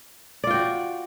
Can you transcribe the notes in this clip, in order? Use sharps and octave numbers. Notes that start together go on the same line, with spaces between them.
F4 F#4 D5 G5